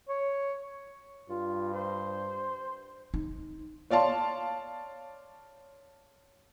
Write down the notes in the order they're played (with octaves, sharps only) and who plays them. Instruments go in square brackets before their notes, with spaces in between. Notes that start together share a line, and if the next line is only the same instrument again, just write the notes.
[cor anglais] C#5
[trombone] G2 [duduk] F4
[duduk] C5
[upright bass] D#4
[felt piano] C#5 D5 F5 A5 C6